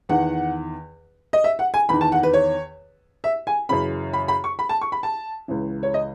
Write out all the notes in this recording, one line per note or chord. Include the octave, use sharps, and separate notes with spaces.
E2 D#3 F#5
D#5
E5
F#5
G#5
E2 D#3 B5
A5
F#5
B4
C#5
E5
G#5
F#2 C#3 E3 B5
B5
B5
C#6
B5
A5
C#6
B5
A5
C#2 C#3 E3
C#5
D#5